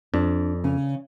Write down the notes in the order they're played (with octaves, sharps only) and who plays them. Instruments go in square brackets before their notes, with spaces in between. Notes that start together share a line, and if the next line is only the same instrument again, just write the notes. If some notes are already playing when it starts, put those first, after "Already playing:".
[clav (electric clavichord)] F2 [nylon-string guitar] D4
[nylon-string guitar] C#3 C#4